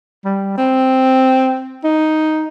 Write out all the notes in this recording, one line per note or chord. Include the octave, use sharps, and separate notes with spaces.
G3
C4
D#4